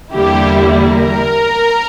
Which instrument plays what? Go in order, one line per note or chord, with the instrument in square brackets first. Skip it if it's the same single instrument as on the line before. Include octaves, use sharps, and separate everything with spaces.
[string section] E2 D3 G3 A#3 E4 [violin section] G4
[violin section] A#4